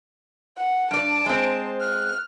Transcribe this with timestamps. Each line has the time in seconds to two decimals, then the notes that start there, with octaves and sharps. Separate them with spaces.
0.57 F#5
0.91 G2 D5 A5 D7
1.26 G#3 C4 C5
1.80 F6 F#6